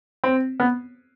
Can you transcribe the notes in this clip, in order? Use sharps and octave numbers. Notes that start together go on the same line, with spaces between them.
C4
B3